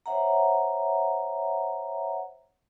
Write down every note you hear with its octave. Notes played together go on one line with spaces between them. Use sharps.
C5 C#5 E5 F#5 A#5